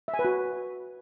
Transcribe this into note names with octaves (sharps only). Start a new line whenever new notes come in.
E5
G#5
B4
F#4